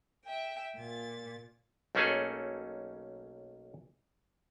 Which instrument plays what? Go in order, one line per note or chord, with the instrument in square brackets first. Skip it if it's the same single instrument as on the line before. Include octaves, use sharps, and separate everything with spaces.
[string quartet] E5 G5
A#2 A6
[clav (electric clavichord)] B1 A3 A#3 C#4 G#4 A4